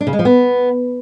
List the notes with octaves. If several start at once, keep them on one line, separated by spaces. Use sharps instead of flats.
D4
C#3
G#3
F3
B3